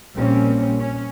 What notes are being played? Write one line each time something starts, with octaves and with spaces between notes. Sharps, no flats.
A#1 A#2 G3 A#3 C4 C#4
C#4